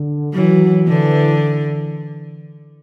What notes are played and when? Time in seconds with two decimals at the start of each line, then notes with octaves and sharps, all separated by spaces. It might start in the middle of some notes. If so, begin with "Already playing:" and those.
Already playing: D3
0.34 E3 F#3
0.88 D3 E3